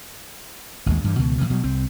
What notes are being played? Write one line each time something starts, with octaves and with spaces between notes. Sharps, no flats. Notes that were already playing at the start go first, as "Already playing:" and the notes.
A1 D#2 G#3
G2 E3 G3
C#2 B2 D#3
A2 C3 E3 F3
B2 F#3 G3
C2 C4